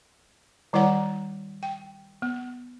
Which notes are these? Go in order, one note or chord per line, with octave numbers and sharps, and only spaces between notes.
D#3 G3 E4 C#5 F#5 A#5
G5
B3